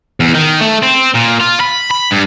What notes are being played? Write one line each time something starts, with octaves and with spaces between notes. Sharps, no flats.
E2
D#3
A3
C4
A#2
F4
B5
B5
G2